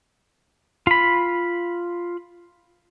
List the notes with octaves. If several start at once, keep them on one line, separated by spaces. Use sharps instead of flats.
F4 B5